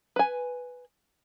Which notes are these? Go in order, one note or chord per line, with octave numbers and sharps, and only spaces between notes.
B4 G#5